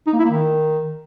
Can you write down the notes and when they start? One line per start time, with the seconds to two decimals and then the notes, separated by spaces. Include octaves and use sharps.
0.07 D#4
0.13 A#3
0.19 E4
0.25 A#3
0.31 D#3